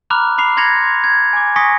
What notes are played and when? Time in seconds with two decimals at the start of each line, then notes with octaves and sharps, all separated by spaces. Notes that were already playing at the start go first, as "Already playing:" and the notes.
0.10 A#5 B5 D6 F6 F#6 F7
0.38 B5 D6 C7 F7
0.57 B5 C6 G#6 A#6 C#7 F7
1.04 G#6
1.33 G#5 D6
1.56 G#5 C#6 D#6 A#6 B6 C#7